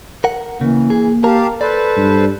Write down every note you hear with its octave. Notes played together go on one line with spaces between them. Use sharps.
A#4 F#5
C#3 E3 A#3
G#4
G4 A#4 F5 A5 A#5
A4 B4 C5 D5
G2